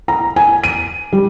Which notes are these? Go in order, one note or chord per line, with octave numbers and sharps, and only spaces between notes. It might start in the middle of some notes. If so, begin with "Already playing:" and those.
A#5
G#5
D#7
G3